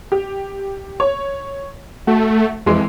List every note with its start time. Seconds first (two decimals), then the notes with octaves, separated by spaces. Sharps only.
0.12 G4
1.00 C#5
2.07 A3 F#4
2.66 F2 E3 G#3